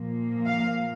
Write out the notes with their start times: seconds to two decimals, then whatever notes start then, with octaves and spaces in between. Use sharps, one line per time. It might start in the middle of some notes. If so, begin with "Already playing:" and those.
Already playing: A#2 F3 A#3
0.45 F5